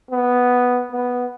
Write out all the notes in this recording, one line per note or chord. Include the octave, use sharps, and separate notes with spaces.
B3
B3